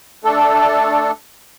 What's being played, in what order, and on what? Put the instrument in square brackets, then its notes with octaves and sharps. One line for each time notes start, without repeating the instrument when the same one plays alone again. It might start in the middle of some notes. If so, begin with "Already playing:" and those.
[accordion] A3 D4 A4